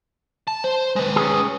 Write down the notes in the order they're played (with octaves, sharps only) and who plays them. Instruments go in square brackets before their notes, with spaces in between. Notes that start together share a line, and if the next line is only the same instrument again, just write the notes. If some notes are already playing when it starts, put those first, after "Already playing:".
[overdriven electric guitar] A5
C5
G#3 B4
[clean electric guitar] C#4 G#4